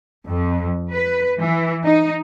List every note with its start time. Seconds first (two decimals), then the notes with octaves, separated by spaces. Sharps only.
0.28 F2
0.92 B4
1.42 E3
1.84 D#4